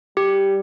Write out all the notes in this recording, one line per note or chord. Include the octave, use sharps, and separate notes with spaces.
G3 G4